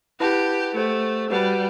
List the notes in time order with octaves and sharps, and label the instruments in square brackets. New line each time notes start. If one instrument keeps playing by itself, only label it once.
[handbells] E4 B4 F#5 A5 [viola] G4
[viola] A3 [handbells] G4 C5 F#5
[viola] G3 [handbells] F#4 B4 F#5 A5